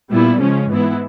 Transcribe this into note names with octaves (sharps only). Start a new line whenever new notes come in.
A#2 G3 B3 E4
C#3 F3 G#3 C#4
G#2 E3 G#3 B3 E4